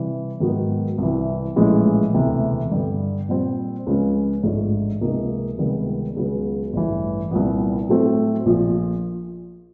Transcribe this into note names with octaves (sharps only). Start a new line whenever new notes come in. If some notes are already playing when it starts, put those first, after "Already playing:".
Already playing: C3 E3 G3
G#2 D#3 F#3 B3
C2 C3 E3
A#1 A2 E3 G#3 C#4
E1 D2 C3 E3
G2 D3 G3
A#2 G3 C4
C#2 C#3 F3 G#3 C#4
A1 G#2 F3 A3 D4
C#2 C3 F3 A#3 D#4
C#2 C3 D#3 G3 B3
C#2 C#3 F#3 B3
A1 G2 E3
C2 A#2 G3 B3
A2 F#3 A3 C4
A#1 A#2 F3